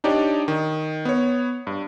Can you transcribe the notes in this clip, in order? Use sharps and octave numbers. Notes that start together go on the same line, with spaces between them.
D4 D#4 G4 C#5 D5
D#3
B3 C#5
G2